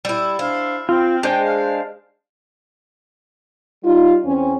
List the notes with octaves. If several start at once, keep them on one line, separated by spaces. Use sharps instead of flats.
G3 E4
D4 E4 C5 F5
C4 F4
G#3 D4 C5 G5
F5
G3 D#4 F4
E2 C4 C#4